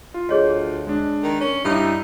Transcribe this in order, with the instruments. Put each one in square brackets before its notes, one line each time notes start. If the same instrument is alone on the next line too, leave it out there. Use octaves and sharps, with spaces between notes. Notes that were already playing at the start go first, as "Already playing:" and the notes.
[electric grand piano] F4
[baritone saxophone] D2 [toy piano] G#4 C#5 D#5
[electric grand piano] G#3 D4
[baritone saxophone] D#3
C#4
[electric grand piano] G2 G3 E4 [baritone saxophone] D#4